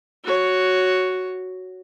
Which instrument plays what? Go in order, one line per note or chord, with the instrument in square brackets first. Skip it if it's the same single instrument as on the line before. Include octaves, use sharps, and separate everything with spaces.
[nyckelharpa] F#4 C#5